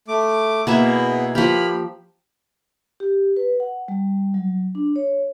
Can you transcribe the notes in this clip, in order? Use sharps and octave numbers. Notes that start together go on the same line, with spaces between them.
A3 D6
B2 A#3 B3 E4 G#4 E5
F3 A#3 G4 B5 F6
G4
B4
F#5
G3
F#3
D4
C#5